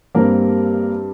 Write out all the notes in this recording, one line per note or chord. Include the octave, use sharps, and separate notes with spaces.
G2 G3 A#3 C4 A#4